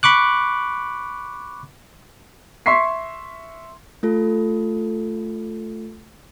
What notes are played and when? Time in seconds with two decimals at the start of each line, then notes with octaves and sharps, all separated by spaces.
0.03 B5 C#6 D6 F#6
2.66 E5 C6 C#6 B6 C7
4.03 A3 F4 A4